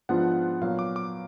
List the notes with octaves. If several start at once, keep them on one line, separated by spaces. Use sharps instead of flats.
G#2 F3 B3 D4 F4 F#5
A#2 F#3 B3 F5
D6
D6